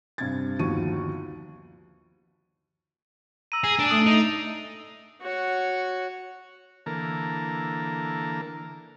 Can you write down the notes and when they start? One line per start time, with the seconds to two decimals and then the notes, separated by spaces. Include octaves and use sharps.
0.18 G2 C3 G#6 A6
0.59 G1 D#2 F3 F#4 C#6 D#7
3.52 A#5 E6 D#7
3.64 G#4 C7
3.79 D4 D7
3.91 A3 D#6
4.06 D#4
5.21 F#4 C#5
6.86 D3 E3 A#3 A4 A#4